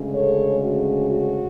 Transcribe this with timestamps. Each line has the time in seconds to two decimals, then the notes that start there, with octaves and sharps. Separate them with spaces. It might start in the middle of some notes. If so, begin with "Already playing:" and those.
Already playing: D2 C#3 G#3 C#4
0.14 A4 C#5
0.62 F#4
1.09 F#4